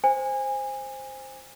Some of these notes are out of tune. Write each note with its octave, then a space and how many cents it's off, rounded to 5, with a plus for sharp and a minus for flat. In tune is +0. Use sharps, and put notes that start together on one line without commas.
C5 +0 G#5 -25